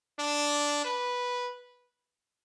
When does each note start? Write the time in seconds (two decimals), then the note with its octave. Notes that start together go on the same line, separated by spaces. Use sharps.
0.19 D4
0.84 B4